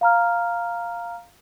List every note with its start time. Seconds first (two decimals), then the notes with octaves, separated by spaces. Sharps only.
0.01 F5 A#5 F6